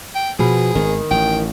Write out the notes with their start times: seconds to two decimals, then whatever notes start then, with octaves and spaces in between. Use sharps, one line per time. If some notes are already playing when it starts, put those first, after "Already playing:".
0.15 G5
0.39 B2 F3 G#4
0.75 G#1 D#3
1.11 A1 G5